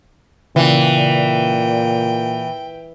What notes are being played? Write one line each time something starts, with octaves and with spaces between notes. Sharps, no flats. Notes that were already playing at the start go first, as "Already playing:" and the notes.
A#2 C#3 E3 D5 G5